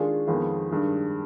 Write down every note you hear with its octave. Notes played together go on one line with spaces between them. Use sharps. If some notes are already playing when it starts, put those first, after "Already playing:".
Already playing: D#3 G#3 D4 F4 G#4
F2 D#3 G#3 B3 F4
G2 D#3 G#3